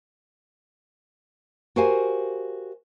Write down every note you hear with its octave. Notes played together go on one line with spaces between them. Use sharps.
F#4 G4 A#4 C5 F5 G#5